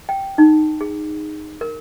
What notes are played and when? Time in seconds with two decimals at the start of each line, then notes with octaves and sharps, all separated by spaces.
0.09 G5
0.38 D#4
0.81 G#4
1.61 A#4